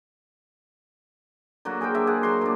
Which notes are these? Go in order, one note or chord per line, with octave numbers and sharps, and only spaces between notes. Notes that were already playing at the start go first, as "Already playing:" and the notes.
D3 F#3 A#3 F#4
G#4 A#4 C5 G5
F#3 D4 A#4 E5
G#4 D5 F#5
F#3 F#4 C6
A#2 D4